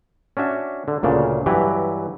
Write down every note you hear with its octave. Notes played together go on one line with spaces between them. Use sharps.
C#4 D4 F#4 E5
D3
D2 A#2 C#3 D4
G2 E3 F#3 G4 B4